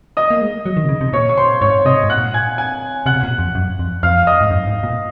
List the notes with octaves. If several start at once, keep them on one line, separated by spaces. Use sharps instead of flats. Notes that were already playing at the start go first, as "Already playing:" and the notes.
D#5 D#6
A#3
G#3
F#3
D#3
C3
C#3
C3
A#2 C#5 C#6
C#6
C5 C6
G#2 C#5 C#6
C3 D#5 D#6
G#2
A#2 F#5 F#6
G#5 G#6
G#5 G#6
C3 F#5 F#6
C3
A#2
F2
F#2
F2
F2 F5 F6
D#5 D#6
G#2
F#2
G#2
A#2